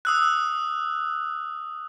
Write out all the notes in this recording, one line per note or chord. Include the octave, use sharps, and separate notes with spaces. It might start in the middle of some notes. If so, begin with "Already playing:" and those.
D#6 E6 F#6